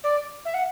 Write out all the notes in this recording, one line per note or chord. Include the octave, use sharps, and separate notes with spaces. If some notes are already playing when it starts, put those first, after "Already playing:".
D5
E5
F#5